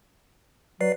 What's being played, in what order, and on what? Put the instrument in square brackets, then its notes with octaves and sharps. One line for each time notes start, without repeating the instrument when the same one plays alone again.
[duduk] F#3 [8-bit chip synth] B4 D5 C7